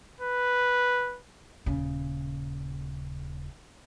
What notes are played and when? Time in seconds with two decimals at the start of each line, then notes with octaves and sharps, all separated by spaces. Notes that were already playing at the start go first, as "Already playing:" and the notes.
0.21 B4
1.66 D#1 C#3